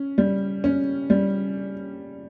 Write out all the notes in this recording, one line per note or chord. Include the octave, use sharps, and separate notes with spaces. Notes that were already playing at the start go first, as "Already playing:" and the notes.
Already playing: C#4
G3
C#4
G3